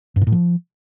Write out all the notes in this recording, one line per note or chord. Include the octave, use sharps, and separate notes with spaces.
G2
B2
A2
F3